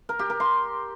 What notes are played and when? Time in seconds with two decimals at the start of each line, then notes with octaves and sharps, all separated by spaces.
0.09 A#4
0.19 G4
0.30 A#4
0.40 C6